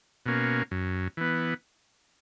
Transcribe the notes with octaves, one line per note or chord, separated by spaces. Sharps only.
B2 A#3 C#4
F#2
E3 B3